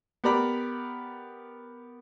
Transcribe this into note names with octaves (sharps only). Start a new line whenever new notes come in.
B3 G4 A#4 D5 A#5 B5